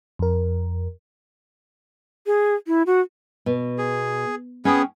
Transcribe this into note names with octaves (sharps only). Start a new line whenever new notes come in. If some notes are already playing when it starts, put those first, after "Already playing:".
F2 A#4
G#4
E4
F#4
B2
G#4
B3 C#4 G#4 G5